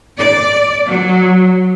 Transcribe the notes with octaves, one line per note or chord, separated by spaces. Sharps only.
D5
F#3